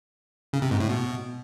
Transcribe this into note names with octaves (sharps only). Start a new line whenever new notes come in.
C#3
C3
G#2
A2
B2